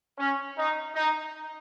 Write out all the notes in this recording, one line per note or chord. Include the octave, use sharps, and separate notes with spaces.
C#4
D#4
D#4